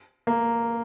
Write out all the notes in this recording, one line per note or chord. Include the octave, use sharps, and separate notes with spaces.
A#3